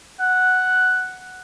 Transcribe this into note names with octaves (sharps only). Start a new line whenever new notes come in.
F#5